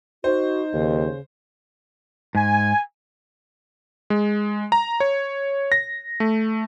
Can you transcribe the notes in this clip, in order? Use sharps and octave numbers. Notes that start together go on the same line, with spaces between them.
D#4 F#4 C5
D#2 C#3
G#2 G#5
G#3
A#5
C#5
A#6
A3